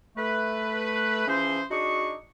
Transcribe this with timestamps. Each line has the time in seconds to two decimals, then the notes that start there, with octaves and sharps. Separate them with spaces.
0.17 A3 B4
1.27 E3 F3 C#4 G#4 C5
1.71 D4 D#4 F#4 G#4 C#6